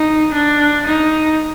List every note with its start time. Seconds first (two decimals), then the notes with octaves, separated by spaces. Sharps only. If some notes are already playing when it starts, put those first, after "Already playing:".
Already playing: D#4
0.33 D4
0.86 D#4